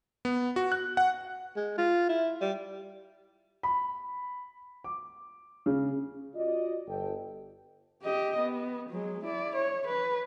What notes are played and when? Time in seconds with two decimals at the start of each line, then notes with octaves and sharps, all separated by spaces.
0.25 B3
0.56 F#4
0.72 F#6
0.97 F#5
1.56 G#3
1.78 F4
2.09 E4
2.41 G3
3.63 B5
4.84 D6
5.66 C#3
6.35 F4 F#4 D5 D#5
6.88 G1 A4 G5
8.03 G4 D#5
8.39 B3
8.90 F#3 G#3
9.24 E4 D5
9.56 C#5
9.87 B4